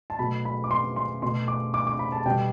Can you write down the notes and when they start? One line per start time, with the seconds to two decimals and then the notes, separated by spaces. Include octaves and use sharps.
0.10 A5
0.19 B2 F#3 A3 B5
0.45 B5
0.64 D6
0.71 C6
0.96 C6
1.22 B2 A3 C6
1.48 D6
1.74 D6
1.87 D6
1.99 B5
2.12 A5
2.25 B2 G3 G5